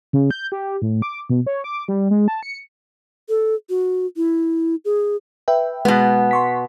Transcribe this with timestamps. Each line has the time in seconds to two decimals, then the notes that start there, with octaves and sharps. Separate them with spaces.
0.13 C#3
0.31 G6
0.52 G4
0.82 A2
1.02 D6
1.30 B2
1.47 C#5
1.64 D6
1.88 G3
2.11 G#3
2.28 A5
2.43 C#7
3.29 A4
3.70 F#4
4.17 E4
4.85 G#4
5.48 B4 E5 G5
5.85 B2 G#3 B3
6.31 C6 C#6 B6